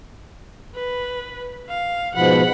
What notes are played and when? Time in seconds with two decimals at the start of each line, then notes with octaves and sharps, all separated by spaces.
0.75 B4
1.69 F5
2.15 G#2 B2 F3 F#5 B5